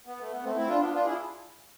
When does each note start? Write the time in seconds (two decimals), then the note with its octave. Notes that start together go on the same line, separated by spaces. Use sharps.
0.07 B3
0.20 A3
0.32 B3
0.43 A3 C4
0.56 C4 E4
0.68 D4 F4
0.81 B3 D4
0.93 D4 F4
1.05 E4 G#4